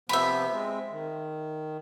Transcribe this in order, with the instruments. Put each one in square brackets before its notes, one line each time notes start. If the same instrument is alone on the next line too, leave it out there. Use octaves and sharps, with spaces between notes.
[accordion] C3 F3 B3 [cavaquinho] E5 B5
[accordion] G#3 C4
D#3